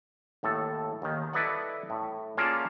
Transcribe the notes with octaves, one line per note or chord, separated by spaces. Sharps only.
D#2 A2 A4
D#2 D#3
E4 A4 B4 D5 D#5 F#5
A2
A#3 C#4 F4 G#4 D5 A5